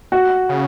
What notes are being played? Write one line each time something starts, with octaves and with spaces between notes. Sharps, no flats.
F#4
C#3